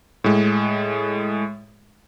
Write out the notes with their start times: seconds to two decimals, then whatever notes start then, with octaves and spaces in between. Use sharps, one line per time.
0.24 A2 G#3